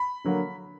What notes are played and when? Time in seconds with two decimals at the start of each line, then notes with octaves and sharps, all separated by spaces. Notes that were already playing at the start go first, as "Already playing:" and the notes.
Already playing: B5
0.24 D3 F#3 A#3